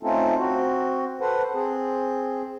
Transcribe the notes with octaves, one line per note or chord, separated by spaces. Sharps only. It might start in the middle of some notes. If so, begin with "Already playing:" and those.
A3 C4 C#4 D#4 F4 A4
C4 F#4
A4 B4 C5 F#5
C4 G#4